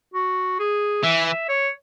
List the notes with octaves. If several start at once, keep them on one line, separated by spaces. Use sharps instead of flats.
F#4
G#4
E3 E5
E5
C#5